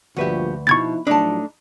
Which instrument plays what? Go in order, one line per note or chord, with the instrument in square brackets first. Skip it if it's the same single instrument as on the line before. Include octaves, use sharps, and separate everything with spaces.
[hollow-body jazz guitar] D2 B4 E5 [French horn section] G2 A#2 F3 [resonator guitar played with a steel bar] F#4 G4
[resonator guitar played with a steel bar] B2 [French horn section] F3 D#4 E4 [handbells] C#6 G#6 A6
[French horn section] A2 F3 F#3 [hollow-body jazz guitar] A3 D4 [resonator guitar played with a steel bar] D#4 A5